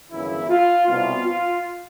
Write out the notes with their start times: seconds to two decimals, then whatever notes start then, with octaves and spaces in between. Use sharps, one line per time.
0.11 G1 F#2 C#3 E3 E4
0.49 F4
0.87 C2 B2 F4
1.24 F4